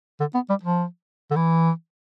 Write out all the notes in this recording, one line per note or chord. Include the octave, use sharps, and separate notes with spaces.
D3
B3
G3
F3
D3
E3